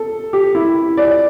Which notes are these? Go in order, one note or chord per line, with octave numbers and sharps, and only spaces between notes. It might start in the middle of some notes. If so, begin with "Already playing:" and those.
Already playing: A4
G4
E4
D5